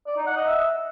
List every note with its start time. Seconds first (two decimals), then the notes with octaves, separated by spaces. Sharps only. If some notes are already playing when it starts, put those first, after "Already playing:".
0.07 D5
0.17 D#4
0.27 F#5
0.37 D#5
0.47 E5